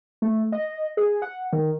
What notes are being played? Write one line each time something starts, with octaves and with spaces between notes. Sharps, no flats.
A3
D#5
G#4
F#5
D#3